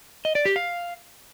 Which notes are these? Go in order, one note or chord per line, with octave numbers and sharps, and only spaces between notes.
D#5
D5
G4
F5